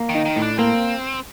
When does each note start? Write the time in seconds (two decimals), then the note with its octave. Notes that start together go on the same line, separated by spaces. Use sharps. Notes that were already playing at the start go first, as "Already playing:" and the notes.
Already playing: A#3
0.09 D#3
0.15 D#4
0.25 D#3
0.36 A2
0.42 D4
0.59 A#3 C4